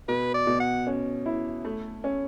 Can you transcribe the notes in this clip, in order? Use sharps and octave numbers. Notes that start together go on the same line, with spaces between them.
B2 B4
D5
B2
F#5
C#4
E4
A3
C#4